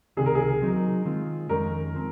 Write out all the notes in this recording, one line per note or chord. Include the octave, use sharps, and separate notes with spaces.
C#2 C3 D#3 G#4
A#4
G#4
F#3 C4 D#4 A#4
D#3 G#3 C4 F4
F2 D#3 G#3 C#4 A#4
F3 C4